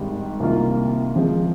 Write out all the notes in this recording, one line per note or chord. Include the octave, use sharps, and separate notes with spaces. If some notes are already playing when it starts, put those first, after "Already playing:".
Already playing: G#1 G#2 D#3 G3 D4
C2 C3 D#3 A#3 F4
C3 F3 G#3